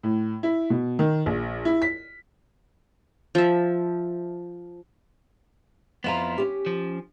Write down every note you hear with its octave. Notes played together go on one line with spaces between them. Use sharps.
A2
E4
B2
D#3
A#1
E4
B6
F3 E5
F2 B3 E4 F4 F5 A#5
C#4 G4
F3